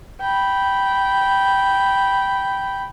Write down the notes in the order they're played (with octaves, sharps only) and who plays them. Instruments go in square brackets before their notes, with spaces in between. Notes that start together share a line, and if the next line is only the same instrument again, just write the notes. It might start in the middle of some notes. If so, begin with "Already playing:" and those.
[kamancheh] G5 B5